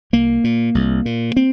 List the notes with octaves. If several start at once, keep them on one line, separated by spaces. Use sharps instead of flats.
C2 A#3
A#2
C2
A#2
C4